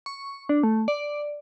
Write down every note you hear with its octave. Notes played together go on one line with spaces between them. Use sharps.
C#6
D4
A3
D5